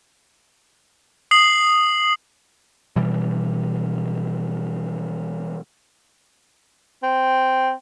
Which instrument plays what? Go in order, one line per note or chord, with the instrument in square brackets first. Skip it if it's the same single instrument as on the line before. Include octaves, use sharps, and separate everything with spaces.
[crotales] D#6 C7 F#7
[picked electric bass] B2 E3 G3
[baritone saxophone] C4